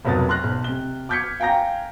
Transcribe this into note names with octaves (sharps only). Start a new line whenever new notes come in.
F1 B1 F#3 A#4 D#6 A6
C6 F6 F#6 A#6
B1
C3 G7
D6 F6 G6 G#6 B6 C#7
F5 G5 G#5 A#5 G6 A#6